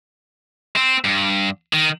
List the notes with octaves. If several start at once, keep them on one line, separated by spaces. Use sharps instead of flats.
C4
G2
D#3